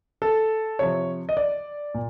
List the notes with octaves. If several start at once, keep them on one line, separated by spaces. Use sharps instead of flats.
A4
C3 F3 C#5
D#5
D5
A#2